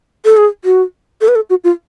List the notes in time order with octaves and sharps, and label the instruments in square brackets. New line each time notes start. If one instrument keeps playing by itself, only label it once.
[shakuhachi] A4
G#4
F#4
A4
B4
A4
F#4
F4